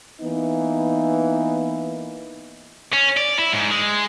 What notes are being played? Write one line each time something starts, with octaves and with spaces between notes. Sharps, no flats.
E3 A#3 B3 D#4
C#4
D5
E4
G#2
G#3